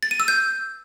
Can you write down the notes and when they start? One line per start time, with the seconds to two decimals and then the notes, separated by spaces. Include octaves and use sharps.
0.03 A6
0.11 D#7
0.20 E6
0.28 G6